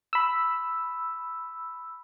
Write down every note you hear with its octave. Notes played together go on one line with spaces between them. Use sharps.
B5 E6